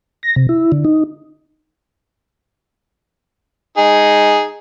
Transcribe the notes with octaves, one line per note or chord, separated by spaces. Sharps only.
A#6
C3
E4
D3
D#4
D#4 G#4